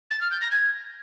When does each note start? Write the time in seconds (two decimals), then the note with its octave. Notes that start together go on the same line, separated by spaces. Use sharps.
0.10 A6
0.21 F6
0.31 G6
0.41 A#6
0.51 G#6